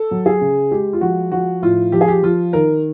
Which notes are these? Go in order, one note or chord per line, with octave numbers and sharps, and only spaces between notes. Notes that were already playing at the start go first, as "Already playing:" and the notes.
Already playing: A4
F#3
G#4
C#3
G#3 G4
F4
F3 F#4
F3 F#4
A2 F4
F3 G4
G#4
G4
F3 F4
D#3 A#4